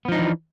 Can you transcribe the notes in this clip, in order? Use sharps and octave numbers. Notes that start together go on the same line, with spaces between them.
E3 F3 B3 D4 D#4